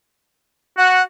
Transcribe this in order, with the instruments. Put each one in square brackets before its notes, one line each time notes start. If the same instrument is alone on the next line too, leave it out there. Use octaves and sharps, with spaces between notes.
[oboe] F#4 [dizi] F#5